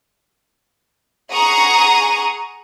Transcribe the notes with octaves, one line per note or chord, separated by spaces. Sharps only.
G#4 F#5 A#5 C#6 D#6